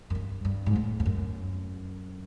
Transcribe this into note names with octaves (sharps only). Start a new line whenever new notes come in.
F#2
G2
G2
G#2
A2
F2
F#2